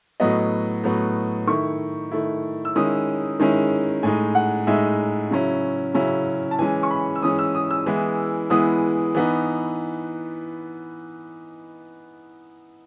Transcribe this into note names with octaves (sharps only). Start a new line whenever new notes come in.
A2 F#3 B3 D#5
A2 F#3 B3
D#3 A3 E4 C#6
D#3 A3 E4
E6
D#3 G#3 C#4 E4 D#6
D#3 G#3 C#4 E4
A2 G#3 D#4 G#5
F#5
A2 G#3 D#4 E5
C#3 F#3 C#4 E4
C#3 F#3 C#4 E4
A5
E3 G#3 C#4 G#5
C#6
B5
E6
E3 G#3 C#4 D#6
E6
D#6
E6
E3 G#3 B3 E4
E3 G#3 B3 E4 D#6
E3 B3 D#4